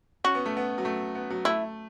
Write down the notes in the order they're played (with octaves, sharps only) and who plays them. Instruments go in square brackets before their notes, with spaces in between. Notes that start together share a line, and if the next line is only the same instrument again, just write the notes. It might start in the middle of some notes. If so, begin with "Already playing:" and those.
[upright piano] C#4 [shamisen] F#4
[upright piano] B3
A3
B3
F#3
A3
B3
F#3
[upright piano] A3 [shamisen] E4